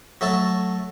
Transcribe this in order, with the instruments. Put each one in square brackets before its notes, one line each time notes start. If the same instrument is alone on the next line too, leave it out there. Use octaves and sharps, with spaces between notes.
[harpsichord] F#3 A3 A5